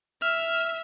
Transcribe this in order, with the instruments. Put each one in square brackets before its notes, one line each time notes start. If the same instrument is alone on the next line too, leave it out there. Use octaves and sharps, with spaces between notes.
[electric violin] E5 [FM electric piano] F6